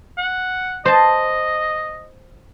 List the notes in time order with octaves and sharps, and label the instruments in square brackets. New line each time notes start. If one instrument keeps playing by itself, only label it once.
[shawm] F#5
[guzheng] C5 A5 [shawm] D#5